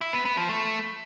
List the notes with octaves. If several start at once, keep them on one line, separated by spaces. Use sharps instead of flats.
E4
B3
B3
F3
A3